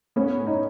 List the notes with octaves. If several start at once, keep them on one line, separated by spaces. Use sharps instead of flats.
B3 C#4
A2
D#4